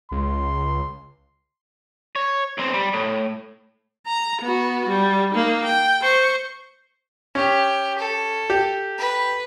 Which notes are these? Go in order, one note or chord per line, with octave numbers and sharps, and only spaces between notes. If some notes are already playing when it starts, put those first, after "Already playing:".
C#2 C6
C#5
B1 C4
G3
A2
A#5
B3 F#4
G3
A#3 D#4
G5
C5 C#6
C#4 G4
A4
G4
B4